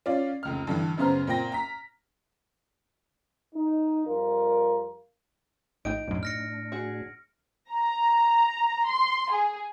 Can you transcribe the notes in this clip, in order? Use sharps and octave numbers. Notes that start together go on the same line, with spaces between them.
C#4 F4 D5
F1 C#2 F6
G2 D3 E3
F#2 C#3 B3 C5 A#5 F6
A#2 C4 G5 A#6
A#5 B6
D#4
F2 G3 F4 A#4
A#1 A2 D#4 G5 D7
B1 F#2 A2 D4
F6 A#6 C#7
F#4 G#4
A#5
C6
G#4